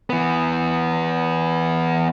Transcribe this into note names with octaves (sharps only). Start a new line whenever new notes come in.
E3 B3